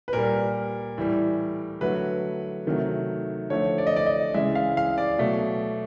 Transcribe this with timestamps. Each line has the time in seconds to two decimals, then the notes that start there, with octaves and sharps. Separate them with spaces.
0.08 B4
0.13 A#2 G3 A#4
0.98 A2 E3 G3
1.81 D3 F#3 A3 B4
2.66 C3 D#3 F#3 A3
3.50 D3 F3 A3 C#5
3.78 D5
3.87 D#5
3.96 D5
4.06 D#5
4.34 C#3 E3 G#3 E5
4.55 F5
4.77 F5
4.98 D5
5.19 B2 F#3 A3